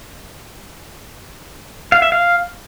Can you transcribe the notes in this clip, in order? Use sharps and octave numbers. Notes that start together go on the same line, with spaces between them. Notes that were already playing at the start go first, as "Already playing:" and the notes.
F5
E5
F5